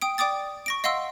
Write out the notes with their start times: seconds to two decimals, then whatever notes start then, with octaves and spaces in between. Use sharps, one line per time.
0.02 G5 D#6 D7
0.18 D5 G5 D6 D#6 A6
0.66 C#6 A#6 D7
0.84 D#5 F5 F#5 C6 E6